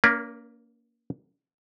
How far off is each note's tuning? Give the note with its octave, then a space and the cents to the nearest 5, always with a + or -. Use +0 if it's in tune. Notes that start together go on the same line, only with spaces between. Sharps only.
A#3 +0 C#4 +45 A#4 +45